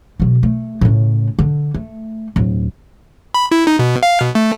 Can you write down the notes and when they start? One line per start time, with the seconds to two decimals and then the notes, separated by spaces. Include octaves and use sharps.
0.20 B2 F#3
0.43 A3
0.81 A2 C#3
1.39 D3
1.74 A3
2.36 D1
3.34 B5
3.51 E4
3.67 D#4
3.79 B2
4.03 F5
4.21 B2
4.35 A3